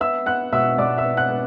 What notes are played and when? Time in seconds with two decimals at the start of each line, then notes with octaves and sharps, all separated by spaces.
0.01 B3 E5 E6
0.26 B3 F#5 F#6
0.53 B2 E5 E6
0.78 B2 D5 D6
0.98 E5 E6
1.05 B3
1.17 F#5 F#6
1.31 B3